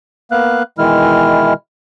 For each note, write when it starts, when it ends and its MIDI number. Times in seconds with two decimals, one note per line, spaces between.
0.32 0.63 58
0.32 0.63 59
0.32 0.63 77
0.32 0.63 90
0.78 1.53 47
0.78 1.53 51
0.78 1.53 52
0.78 1.53 56
0.78 1.53 64
0.78 1.53 89